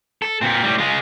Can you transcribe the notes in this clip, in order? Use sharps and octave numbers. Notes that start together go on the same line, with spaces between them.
A4
A#2 C4
A2 G3
G#3 F4